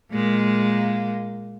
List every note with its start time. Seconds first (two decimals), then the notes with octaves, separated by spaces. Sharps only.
0.12 A#2 G#3 A#3